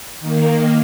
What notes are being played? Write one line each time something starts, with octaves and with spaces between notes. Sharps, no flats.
D#3 A#3